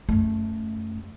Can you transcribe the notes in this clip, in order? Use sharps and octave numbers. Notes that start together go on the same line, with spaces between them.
F#2 A3